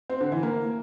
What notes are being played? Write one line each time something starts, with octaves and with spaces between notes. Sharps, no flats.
C4
D3
E3
A#3